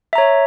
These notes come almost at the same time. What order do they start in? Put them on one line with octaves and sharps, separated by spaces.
E5 A#5 C#5